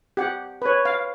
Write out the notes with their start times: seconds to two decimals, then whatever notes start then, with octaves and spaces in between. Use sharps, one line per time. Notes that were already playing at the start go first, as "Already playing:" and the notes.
0.17 G4 F#5
0.62 B4 C#5
0.85 F5